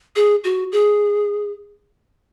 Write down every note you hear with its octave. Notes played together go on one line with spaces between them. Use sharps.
G#4
F#4
G#4